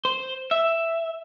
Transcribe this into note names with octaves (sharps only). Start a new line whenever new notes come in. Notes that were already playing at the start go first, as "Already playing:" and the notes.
C5
E5